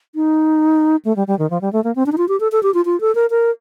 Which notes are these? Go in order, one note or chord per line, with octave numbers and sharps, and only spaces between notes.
D#4
A3
G3
G3
D#3
F3
G3
A3
A#3
C4
D4
D#4
F4
G4
A4
A4
G4
F4
F4
A4
A#4
A#4